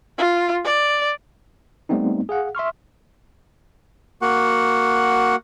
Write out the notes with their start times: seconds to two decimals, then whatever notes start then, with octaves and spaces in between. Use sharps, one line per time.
0.18 F4
0.65 D5
1.89 G3 A3 B3 C4 D#4
2.29 G#4 F5 F#5
2.55 E5 C6 C#6 F6
4.22 A#3 F#4 F#5